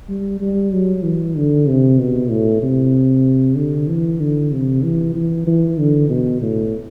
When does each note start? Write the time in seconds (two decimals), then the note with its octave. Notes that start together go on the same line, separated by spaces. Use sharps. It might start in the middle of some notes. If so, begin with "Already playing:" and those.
0.09 G3
0.41 G3
0.72 F#3
1.03 E3
1.35 D3
1.67 C3
1.99 B2
2.30 A2
2.62 C3
3.56 D3
3.88 E3
4.20 D3
4.52 C3
4.82 E3
5.14 E3
5.47 E3
5.78 D3
6.09 B2
6.42 A2